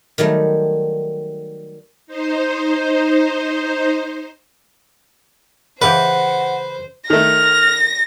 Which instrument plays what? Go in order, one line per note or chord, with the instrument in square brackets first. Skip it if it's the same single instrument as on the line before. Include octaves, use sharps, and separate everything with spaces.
[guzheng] D#3 F#3 G3 A3
[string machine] D#4 C5
[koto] C#3 E3 G4 [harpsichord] B4 [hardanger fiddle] C5 [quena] F#5
[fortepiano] D#3 A3 [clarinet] F6 [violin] A#6